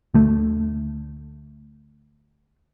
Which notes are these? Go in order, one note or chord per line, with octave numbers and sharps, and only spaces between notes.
D2 A3